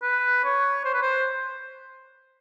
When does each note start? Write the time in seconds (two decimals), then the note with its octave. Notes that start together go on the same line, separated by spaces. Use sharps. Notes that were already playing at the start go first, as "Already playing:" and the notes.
0.02 B4
0.44 C#5
0.85 C5
0.93 B4
1.02 C5